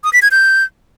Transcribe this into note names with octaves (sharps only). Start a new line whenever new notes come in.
D#6
B6
G#6
G6